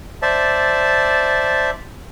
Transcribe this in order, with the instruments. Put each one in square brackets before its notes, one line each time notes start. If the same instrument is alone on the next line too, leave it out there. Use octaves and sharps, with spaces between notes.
[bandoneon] C5 D5 E5 A5